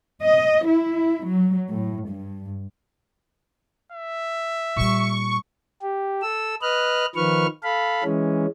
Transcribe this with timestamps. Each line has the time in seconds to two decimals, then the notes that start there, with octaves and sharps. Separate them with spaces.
0.22 D#5
0.66 E4
1.23 F#3
1.71 A2
2.08 G2
3.93 E5
4.76 A#2 G3 C#6
5.82 G4
6.22 A4 E6
6.62 B4 D#5 F6 F#6
7.16 D#3 F3 B4 C#6 F6
7.63 A4 F5 B5
8.04 E3 G#3 C#4